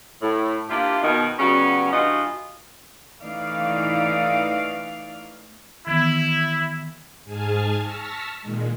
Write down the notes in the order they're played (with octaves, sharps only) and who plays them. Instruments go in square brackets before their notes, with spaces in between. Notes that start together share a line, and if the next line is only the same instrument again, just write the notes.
[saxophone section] A2
A#3 D4 E4 F4 G4
B2 D#3 D#4
C#3 F#3 G3 B3 C#4 F#4
G2 E3 D#4 F4 F#4 D#5
[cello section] E3 A3 D#4 D5 F5
[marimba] D#3 E3 B3 [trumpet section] E4
[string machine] G#2 G#4 G#5 A5 F6 G#6
A5 C#6 E6 F6 A#6 B6
A#2 D#3 G#3